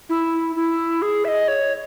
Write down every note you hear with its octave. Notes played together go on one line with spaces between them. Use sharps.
E4
E4
G#4
E5
D#5
C#5